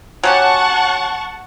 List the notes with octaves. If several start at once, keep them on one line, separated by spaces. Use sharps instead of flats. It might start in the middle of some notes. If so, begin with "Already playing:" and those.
F#3 C#4 G4 F#5 A5 C#6